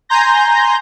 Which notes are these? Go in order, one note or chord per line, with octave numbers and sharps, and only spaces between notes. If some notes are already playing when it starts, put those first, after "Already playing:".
G#5 A#5 C6 G6 A#6